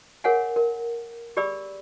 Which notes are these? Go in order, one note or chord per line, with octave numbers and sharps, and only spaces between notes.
G#4 A#4 C#5 F5 F#5 G#5
A#4
G4 G#4 D5 B5 E6